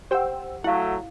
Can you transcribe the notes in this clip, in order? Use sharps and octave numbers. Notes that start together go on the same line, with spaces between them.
G4 C5 F#5 G5 E6
F#3 A3 E4 F5 F#5